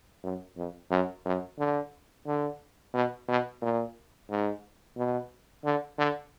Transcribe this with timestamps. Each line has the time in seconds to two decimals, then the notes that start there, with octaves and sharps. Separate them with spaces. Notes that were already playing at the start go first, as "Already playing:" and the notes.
0.24 F#2
0.57 F2
0.91 F#2
1.26 F#2
1.59 D3
2.27 D3
2.94 B2
3.28 B2
3.62 A#2
4.30 G#2
4.97 B2
5.65 D3
5.99 D3